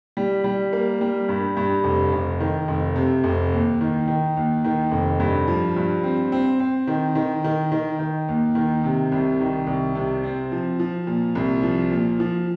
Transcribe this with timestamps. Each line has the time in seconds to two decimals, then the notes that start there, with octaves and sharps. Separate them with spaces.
0.17 G3
0.44 G3
0.73 A#3
1.01 G3
1.29 G2
1.57 G2
1.84 F1
2.13 F1
2.40 D#3
2.68 F1
2.96 C3
3.24 F1
3.52 D#2
3.81 D#3
4.08 D#3
4.37 D#2
4.64 D#3
4.92 F1
5.20 G2
5.48 F3
5.76 G2
6.04 C4
6.32 C4
6.60 C4
6.87 D#3
7.15 D#3
7.44 D#3
7.72 D#3
7.99 D#3
8.28 D#2
8.55 D#3
8.84 C3
9.12 C2
9.40 D#3
9.67 C2
9.95 C3
10.24 C4
10.52 F3
10.80 F3
11.07 A#2
11.35 C2
11.63 F3
11.92 A#2
12.20 F3